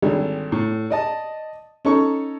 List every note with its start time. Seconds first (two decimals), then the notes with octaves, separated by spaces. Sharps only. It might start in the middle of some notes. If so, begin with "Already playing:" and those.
0.02 G#1 D3 G3
0.52 A2
0.90 D5 D#5 A5
1.85 C#4 D#4 A4 C#6